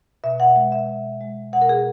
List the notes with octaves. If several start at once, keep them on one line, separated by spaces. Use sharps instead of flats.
B2 E5
F#5
G#3
E5
B2
G#3
B2 F#5
A#4
G#4